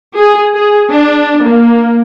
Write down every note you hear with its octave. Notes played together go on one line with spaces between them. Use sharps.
G#4
G#4
D4
A#3